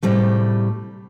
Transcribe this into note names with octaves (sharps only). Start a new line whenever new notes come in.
A2 C3 G3 A3